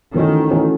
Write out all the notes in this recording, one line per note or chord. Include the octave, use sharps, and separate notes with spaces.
D#3 E3 A3 C#4 F#4
E3 A3 C#4 F#4